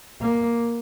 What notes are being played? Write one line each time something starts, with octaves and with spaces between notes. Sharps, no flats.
A#3